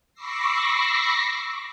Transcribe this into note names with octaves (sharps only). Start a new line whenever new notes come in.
B5 C#6 D6 E6 A#6 C7